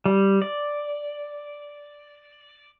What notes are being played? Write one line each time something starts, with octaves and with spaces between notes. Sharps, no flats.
G3
D5